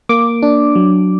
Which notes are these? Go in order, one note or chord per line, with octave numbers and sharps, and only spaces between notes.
A#3 D6
D4
F#3